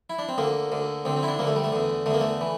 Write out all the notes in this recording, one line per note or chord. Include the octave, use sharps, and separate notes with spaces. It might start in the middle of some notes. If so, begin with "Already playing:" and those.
E4
D4
C4
D2 D3 A#3
D2 D3
D2 D3 C4
C4
E4
D4
D2 D3 A#3
A3
G3
A3
E2 D3
E2 D3 A3 A#3
A3
E3